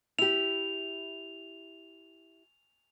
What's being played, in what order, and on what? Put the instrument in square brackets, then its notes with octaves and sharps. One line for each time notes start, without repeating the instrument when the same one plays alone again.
[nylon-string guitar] E4 G4 [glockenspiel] F7